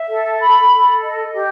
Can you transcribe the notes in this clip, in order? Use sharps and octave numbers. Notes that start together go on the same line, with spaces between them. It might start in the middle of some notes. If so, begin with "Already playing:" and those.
Already playing: E5
A4
B5
A4
D#5
G4